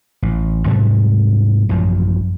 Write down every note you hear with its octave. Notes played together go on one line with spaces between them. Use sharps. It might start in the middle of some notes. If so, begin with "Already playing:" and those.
A1
G#2 C3 F#3 G3
A1 F#2 F3